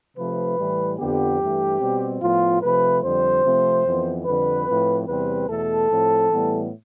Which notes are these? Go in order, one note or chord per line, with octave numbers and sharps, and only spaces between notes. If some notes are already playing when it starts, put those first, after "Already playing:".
C3 F3 A3 B4
A2 E3 G3
F2 D3 F3 B3 G4
G2 E3 A3
B2 G3 C4
A2 F3 B3 F4
C3 F3 A3 B4
F2 D3 G3 C5
C3 F3 A3 C4
F2 E3 B3
F2 D3 G3 B4
A2 F3 C4
E2 C3 G3 C4 B4
E2 B2 A3 A4
A2 F3 C4
A2 E3 G3 B3